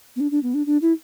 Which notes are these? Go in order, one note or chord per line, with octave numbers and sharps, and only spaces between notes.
B3
D4
D4
B3
D4
D4
E4